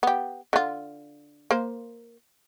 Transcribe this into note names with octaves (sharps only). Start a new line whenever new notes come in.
B3 G4
D3 F4
A#3 C5